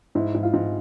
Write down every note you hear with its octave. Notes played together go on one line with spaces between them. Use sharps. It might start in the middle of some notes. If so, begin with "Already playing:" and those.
G#2 E4
G#2
F4
G#2